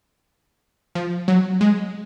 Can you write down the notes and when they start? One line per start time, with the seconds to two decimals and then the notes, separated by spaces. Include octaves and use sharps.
0.95 F3
1.28 F#3
1.61 G#3